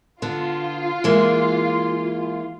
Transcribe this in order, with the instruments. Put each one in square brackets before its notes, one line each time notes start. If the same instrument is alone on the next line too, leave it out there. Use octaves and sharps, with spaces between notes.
[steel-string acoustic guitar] D3 B3 [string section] F4
[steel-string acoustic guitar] E3 G#3 A#3